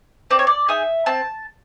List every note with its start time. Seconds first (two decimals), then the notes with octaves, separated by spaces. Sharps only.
0.30 C4 D5
0.39 C#5
0.47 D5
0.68 D#4 G#4 E5
1.06 C4 A5